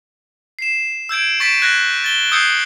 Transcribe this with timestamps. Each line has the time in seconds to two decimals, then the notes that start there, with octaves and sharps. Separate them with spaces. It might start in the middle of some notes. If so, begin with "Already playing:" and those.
0.59 C7 E7
1.09 E6 G6 G#6 D7
1.40 C#6 A6 B6 D7 E7
1.62 F#6 G#6 A#6
2.04 A6 G7
2.32 D#6 E6 G6 G#6 C7 C#7